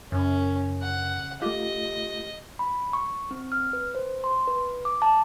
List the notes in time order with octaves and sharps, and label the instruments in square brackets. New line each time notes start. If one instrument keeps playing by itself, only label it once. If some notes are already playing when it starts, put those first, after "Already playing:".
[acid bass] F#2 [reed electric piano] C#3 [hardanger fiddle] C#4
[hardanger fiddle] F#5
[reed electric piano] A3 F4 [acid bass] G4 [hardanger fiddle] D#5
[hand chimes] B5
C#6
C4
F6
B4
C5
C6
B4
D6
A5